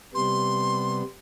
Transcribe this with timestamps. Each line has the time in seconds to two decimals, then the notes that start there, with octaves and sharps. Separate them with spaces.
0.15 C3 G3 B3 C6